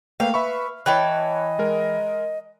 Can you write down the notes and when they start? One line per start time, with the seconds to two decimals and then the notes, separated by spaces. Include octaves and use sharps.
0.20 A3 A#3 B4 F5 G5
0.34 B4 E5 B5 C#6
0.86 E3 C#5 D#5 G5 A5 F#6
1.59 G#3 A#4